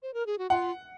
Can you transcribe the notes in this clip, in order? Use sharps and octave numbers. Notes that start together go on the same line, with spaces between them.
C5
A#4
G#4
F#4
F4 F#5